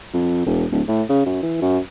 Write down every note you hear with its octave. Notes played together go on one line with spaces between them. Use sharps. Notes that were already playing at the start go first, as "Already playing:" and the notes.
F2
E1
D1
A2
C#3
F#2
E3
F#2